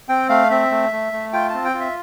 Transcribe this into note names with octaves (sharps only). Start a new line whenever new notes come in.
C4 G5
A3 F5
C4 E5
A3
A3
A3
F4 G5
C4 A5
G5
F4
E5